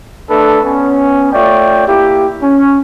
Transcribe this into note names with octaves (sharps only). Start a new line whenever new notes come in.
A3 D4 A4 B4
B3 C#4
A3 F4 C#5 D5 G5
A#3 E4 G4
C#4